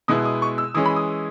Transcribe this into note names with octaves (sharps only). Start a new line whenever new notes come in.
B2 G#3 B3 E4 D#6
D#6
C#6
E6
E3 G#3 C#4 D#6
B5
D#6